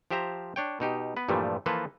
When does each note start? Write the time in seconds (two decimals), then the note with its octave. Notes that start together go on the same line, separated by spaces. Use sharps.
0.11 F3 G4 C5 E5 A#5
0.56 D4 C#5 G5
0.80 B2 D#4 G4
1.17 B3 B4
1.29 G2 A#2 E3 F3 G3 A3
1.66 E3 F3 A#3 F4 A4 B4